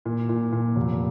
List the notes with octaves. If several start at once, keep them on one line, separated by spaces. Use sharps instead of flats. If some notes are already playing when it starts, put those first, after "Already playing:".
A#2
A#2
A#2
F1